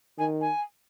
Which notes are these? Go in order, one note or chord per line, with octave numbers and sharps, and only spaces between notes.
D#3 G#5
G#5